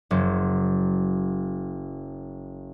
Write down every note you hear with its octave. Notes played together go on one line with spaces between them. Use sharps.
F#1 F#3 C5